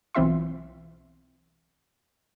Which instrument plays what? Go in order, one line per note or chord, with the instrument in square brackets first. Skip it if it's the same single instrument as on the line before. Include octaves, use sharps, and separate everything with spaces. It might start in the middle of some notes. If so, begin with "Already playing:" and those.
[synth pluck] B1 E3 C4 F4 E5 C6